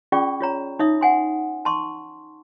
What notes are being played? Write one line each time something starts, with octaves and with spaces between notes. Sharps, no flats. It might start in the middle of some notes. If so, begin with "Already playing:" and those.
C#4 F4 G#4 D5 G5 C#6
F4 C#5 A#5
D#4 C#5 E5 D#6
F#5 G#5 C6
A5 C6 C#6